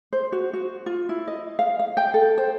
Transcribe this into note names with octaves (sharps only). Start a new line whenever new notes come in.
C5
F#4
F#4
F4
E4
D#5
F5
F5
G5
A4
C5